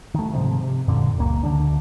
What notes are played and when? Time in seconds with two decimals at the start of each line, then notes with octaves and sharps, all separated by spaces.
0.14 D#3 A3
0.33 G#2 C3 D#3 F3
0.61 C3
0.88 E1 F#2 A#2 D3
1.18 D#1 C#2 A#3
1.43 D2 D3 G#3 D4